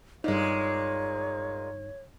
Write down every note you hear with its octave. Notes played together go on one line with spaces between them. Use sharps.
G2 A#2 G#3 D#4 C#5